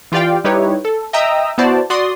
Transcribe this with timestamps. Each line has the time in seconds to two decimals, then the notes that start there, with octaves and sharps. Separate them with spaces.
0.12 E3 F4 G4 D5 F5 G5
0.44 G3 D#4 E4 G4 B4 C#5
0.85 A4
1.13 D#5 E5 G5 A#5 D#6 E6
1.58 B3 E4 F#4 C5 D5 A5
1.90 F#4 D5 C6 D#6